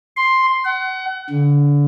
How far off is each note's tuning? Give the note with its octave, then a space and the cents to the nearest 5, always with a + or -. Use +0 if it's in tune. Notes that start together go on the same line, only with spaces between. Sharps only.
C6 +5
F#5 +30
D3 -30